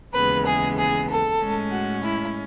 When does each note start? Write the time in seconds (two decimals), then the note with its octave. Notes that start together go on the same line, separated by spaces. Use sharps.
0.14 D#2 C#3 E3 G#3 B3 B4
0.46 G#4
0.78 G#4
1.10 A4
1.41 A2 G#3 C#4
1.72 F#4
2.03 E4